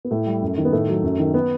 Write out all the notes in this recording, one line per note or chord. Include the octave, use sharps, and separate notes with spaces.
B3
A2 A3
G3
F#2
D#3
B3
A2 A3
F#3
F#2
D#3
B3